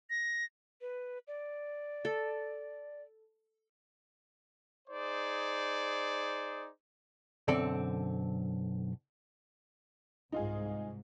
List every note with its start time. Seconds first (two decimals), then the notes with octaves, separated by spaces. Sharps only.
0.10 A#6
0.81 B4
1.28 D5
2.05 A4
4.88 D#4 G#4 C5 D5
7.48 B1 F#2 D3 C4 A4 D5
10.32 C2 G#2 D#4 F4 G#4